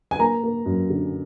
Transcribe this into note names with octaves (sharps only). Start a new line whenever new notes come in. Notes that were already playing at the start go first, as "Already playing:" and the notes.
G#5
A#3 A#5
A#3
F#2
D3